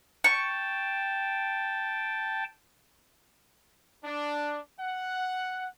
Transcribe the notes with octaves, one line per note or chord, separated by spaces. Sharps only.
G5 A5 C#6
D4
F#5